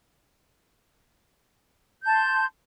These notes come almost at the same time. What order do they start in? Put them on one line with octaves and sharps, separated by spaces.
G6 A5 C6